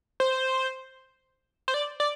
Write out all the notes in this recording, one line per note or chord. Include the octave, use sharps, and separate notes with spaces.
C5
C5
D5
D5